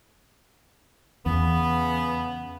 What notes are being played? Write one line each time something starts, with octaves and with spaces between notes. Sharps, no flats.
E2 C#3 B3